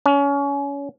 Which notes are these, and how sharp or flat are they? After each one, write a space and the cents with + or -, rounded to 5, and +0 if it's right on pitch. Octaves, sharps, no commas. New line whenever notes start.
C#4 +25